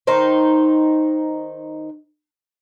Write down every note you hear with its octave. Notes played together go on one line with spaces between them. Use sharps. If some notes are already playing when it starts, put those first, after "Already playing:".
D#3 D#4 C5